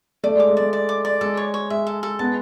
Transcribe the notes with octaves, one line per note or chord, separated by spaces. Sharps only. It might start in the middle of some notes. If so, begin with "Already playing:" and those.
A3 D5
G#3
D6
G#3
A3 D5
D5
D6
D5
G#3 A4
C#5
C#5
G#3 E5
A4
A4
G#3 B3 A5